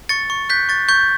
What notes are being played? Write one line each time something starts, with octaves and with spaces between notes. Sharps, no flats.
C#6 A6 C#7
C#6
F#6 G6 B6
C#6 A6
C#6 G6